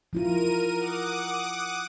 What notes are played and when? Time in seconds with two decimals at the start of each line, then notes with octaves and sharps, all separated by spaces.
0.13 F3 E4 F4 A#4 D#7
0.78 F#5 D6 D#6